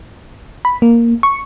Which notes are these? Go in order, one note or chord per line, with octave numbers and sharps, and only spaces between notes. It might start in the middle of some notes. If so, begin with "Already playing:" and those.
B5
A#3
C#6